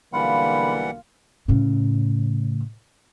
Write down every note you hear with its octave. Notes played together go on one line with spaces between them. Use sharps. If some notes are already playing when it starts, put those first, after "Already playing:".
B1 D3 E3 G3 A#3 F4 F#5 B5
A2 C#3